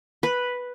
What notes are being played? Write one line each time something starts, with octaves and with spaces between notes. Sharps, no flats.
B4